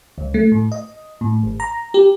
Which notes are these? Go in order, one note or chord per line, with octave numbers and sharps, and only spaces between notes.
C#2
A3
A2
D#5
A2
G#1
A#5
G4